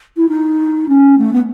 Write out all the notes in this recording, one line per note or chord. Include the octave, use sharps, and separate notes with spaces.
E4
D#4
C#4
A3
B3